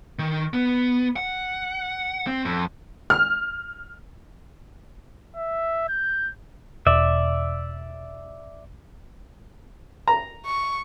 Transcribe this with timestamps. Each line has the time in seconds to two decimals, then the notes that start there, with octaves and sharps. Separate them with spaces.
0.19 D#3
0.54 B3
1.16 F#5
2.27 C4
2.45 F2
3.10 F6
5.36 E5
5.89 G6
6.87 E1 D5 E5
10.08 A#5
10.46 C#6